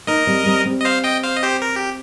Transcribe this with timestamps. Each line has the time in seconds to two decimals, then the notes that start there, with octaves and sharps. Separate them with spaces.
0.07 A#3 D#4 A#4 D#5
0.27 G3 C4
0.46 G3 C4
0.66 G3 C4
0.81 D#5
0.85 C5 F5
1.04 D#5 G5
1.23 C5 F5
1.36 D#5
1.43 G4 C5
1.62 A#4
1.76 G4